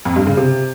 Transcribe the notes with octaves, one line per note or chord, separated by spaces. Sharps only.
F2
G2
C#3
C3